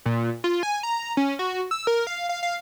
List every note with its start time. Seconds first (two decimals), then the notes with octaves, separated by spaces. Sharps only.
0.06 A#2
0.44 F4
0.63 G#5
0.83 A#5
1.17 C#4
1.39 F#4
1.71 E6
1.87 A#4
2.07 F5
2.29 F5
2.43 F5